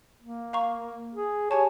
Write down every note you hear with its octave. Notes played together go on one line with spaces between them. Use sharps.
A#3
F5 A#5 C#6
G#4
G4 C#5 G#5 A5